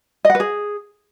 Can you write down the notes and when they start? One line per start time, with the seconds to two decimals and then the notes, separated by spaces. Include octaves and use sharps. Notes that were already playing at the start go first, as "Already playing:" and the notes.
0.25 D#5
0.30 F#5
0.35 B4
0.40 G#4